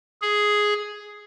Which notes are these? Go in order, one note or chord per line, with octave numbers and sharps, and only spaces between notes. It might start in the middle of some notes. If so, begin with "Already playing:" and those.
G#4